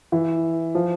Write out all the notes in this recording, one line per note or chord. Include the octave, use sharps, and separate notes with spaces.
E3
F3